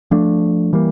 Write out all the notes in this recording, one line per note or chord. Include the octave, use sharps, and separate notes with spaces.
F3 A3 D4
E3 G3 A#3